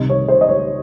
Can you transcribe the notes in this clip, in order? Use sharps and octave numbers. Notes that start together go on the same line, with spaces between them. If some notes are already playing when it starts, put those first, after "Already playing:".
Already playing: C2 C3 D#3 D#5
C#5
C5
D#5
C#5